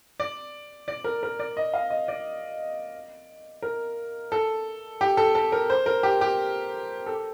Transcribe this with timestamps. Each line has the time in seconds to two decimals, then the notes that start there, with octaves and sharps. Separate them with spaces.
0.20 D5
0.88 D5
1.04 A#4
1.23 A#4
1.40 D5
1.57 D#5
1.74 F5
1.90 D#5
2.08 D5
3.62 A#4
4.32 A4
5.01 G4
5.17 A4
5.35 A4
5.52 A#4
5.70 C5
5.86 A#4
6.03 G4
6.21 G4
7.07 A4